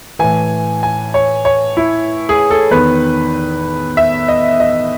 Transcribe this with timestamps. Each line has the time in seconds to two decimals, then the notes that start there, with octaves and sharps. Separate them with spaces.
0.19 A2 E3 G#5
0.83 G#5
1.14 C#5
1.45 C#5
1.77 E4
2.29 G#4
2.51 A4
2.71 E2 D#3 B4
3.97 E5
4.28 D#5
4.60 D#5